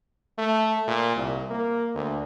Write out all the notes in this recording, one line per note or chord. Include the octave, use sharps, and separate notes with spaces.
A3
A#2
C2
A#3
D2